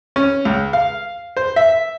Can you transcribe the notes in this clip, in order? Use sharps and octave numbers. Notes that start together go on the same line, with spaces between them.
C#4
C#2
F5
C5
E5